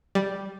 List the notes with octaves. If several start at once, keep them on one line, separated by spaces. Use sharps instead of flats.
G3